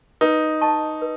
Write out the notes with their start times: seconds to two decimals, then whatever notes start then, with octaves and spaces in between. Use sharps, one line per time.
0.21 D#4 B4
0.61 D#5 A5 C#6
1.02 B4